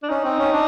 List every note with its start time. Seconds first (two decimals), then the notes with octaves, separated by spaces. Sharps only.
0.03 D4
0.09 C#4 D#4
0.24 C4
0.38 C#4
0.52 D4